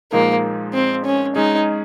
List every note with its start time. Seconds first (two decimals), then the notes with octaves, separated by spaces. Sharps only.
0.12 A#2 F3 G#3 A#3 D#4 G#4
0.74 C4
1.04 C#4
1.36 G#3 C#4 D#4 G#4